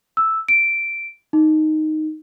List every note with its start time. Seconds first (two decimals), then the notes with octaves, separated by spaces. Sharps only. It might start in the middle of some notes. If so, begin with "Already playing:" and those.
0.17 E6
0.49 D7
1.33 D#4